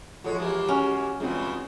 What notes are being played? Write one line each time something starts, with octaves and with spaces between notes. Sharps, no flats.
E2 F3 G#3 F#4 A4 C#5
E3 G#3 A#3 G4
C#4 F#4 G#5 F6
G2 C#3 E3 G#3 C4 F4 F#4